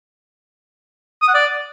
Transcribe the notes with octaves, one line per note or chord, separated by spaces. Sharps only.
D#6
F#5
D5